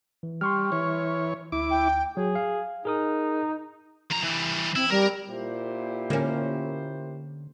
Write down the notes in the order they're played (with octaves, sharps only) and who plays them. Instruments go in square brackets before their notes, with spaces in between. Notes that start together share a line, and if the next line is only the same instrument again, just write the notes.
[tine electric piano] E3
[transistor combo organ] G3 [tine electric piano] C6 C#6 F6
[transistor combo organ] E3 C#5
[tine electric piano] D2 [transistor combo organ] E4 D6
[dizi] G5
[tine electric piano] F#3 [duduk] G#4
[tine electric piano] F5
[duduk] D#4 [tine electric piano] G#4 A#4 D#6
[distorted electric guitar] F2 A#5
E3 G3
[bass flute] C4 [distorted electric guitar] E4
[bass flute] G3 [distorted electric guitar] A#4
[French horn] A#2 [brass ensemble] E4 G4 C5
[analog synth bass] D3 [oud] A#3 C#4